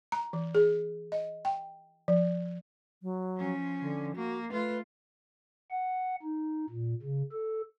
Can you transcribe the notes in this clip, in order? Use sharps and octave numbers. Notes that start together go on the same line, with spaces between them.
A#5
E3
G#4
D#5
G5
F3
F#3
F3 C#4
D3
A#3 F#4
A3 F4 B4
F#5
D#4
A#2
C#3
A4